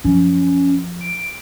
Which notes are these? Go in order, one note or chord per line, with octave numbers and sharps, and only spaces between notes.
F#2 F3 C#4
D7